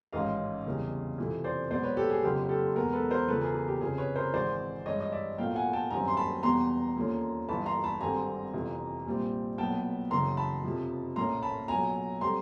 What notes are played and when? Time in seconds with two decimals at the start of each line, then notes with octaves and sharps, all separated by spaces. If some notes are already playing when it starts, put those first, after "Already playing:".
0.13 A1 G#2 D#3 G#3 C#4 D#5 F5
0.66 F1 E2 C#3 E3 G3
1.18 F2 C3 E3 A3
1.44 C5 D5
1.71 B1 B2 G#3 B3 C5 D5
1.83 B4 C#5
1.97 G4 A4
2.10 G#4
2.23 F#1 F2 D3 F#3 G4
2.49 G4 A4
2.76 E2 B2 G#3 B3 G#4 A#4
2.93 A4 B4
3.11 A#4 C5
3.28 E2 C#3 F3 A4 B4
3.41 G#4 A#4
3.54 G#4
3.68 G4
3.81 F1 F2 C#3 G#4
3.98 B4 C#5
4.16 A#4 C5
4.33 G#1 G#2 E3 G#3 C5 D5
4.86 G2 E3 G#3 C#5 D#5
5.00 D#5
5.12 D5 E5
5.38 B1 A2 F3 A#3 F5 G5
5.55 F#5 G#5
5.73 G5 A5
5.91 G1 F#2 D#3 G3 C4 G#5 A#5
6.08 C6
6.17 A5 B5
6.43 E2 B2 G3 B3 A#5 C6
6.96 D#2 D3 F3 A#3 C#4
7.49 G1 G2 E3 A5 B5
7.66 A#5 C6
7.84 A5 B5
8.01 G#1 G2 D3 G3 C4 G#5 A#5
8.54 G1 F2 C3 E3
9.06 A#1 A#2 G3 C4
9.58 B1 A#2 F#3 B3 G5 A5
10.11 F#1 F#2 C#3 E3 A#5 C6
10.37 A5 B5
10.63 F2 C3 F3
11.16 A#1 A2 F3 A#3 C#4 A#5 C6
11.43 A5 B5
11.68 B1 A#2 F#3 G#5 A#5
12.21 D3 G3 C4 A#5 C6